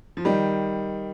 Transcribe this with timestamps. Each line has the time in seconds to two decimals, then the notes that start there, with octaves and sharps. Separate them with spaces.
0.17 F3
0.25 D#3 G3